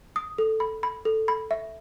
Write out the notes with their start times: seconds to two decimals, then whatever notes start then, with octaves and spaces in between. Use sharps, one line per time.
0.16 D#6
0.38 A4
0.60 B5
0.83 B5
1.05 A4
1.28 B5
1.51 E5